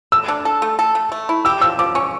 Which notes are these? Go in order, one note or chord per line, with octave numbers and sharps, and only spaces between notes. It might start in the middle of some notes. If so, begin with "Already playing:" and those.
A3 E6
D4
A4
A3
A4
A3
A3
E4
G4 E6
F3 E6
F3 D6
C#4 C#6